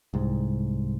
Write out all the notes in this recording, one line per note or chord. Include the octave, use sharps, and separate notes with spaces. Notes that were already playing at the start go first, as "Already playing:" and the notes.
C2 G#2